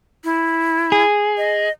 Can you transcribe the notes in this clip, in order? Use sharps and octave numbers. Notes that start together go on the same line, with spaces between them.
E4
G#4
D#5